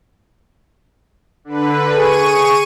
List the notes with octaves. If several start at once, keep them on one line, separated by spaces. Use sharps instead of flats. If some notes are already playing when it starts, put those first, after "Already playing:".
D3 B4
G#4 C#6 D#7